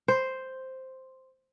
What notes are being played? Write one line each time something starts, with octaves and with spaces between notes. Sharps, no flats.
C5